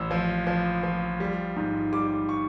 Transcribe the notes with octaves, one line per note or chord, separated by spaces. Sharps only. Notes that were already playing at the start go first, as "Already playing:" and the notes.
Already playing: A1 E6
F3
F3
F3
G3
G#2
G3 D6
C#6